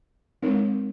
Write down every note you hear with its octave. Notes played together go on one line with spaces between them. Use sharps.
G#3 C4 D#4 A#4 C#5